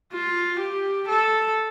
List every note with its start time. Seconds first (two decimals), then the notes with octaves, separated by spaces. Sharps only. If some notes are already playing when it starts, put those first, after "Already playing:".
0.13 F4
0.60 G4
1.08 A4